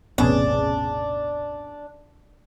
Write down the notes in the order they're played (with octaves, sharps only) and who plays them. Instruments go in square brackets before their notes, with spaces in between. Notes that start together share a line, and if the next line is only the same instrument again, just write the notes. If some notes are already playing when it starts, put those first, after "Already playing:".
[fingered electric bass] E1 A1 C3 [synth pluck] B3 C#4 G#4 [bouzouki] D4